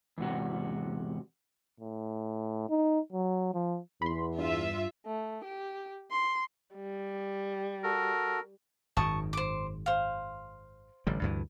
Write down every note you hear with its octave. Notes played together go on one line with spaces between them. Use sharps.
E2 G#2 C3 F#4
A2
D#4
F#3
F3
E2 B5 C6
G2 F4 E5
A3
G4
C6
G3
F#4 A4 A#4
G#1 F#2 D#3 A5 C#6 D#6
C5 D6
C5 F5
A1 D3 G3
D2 G2 E3